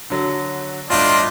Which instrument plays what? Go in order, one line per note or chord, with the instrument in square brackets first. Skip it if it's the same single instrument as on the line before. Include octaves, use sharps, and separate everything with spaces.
[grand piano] D3 F#3
[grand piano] G1 A2 [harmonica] D4 D#5 [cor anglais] F4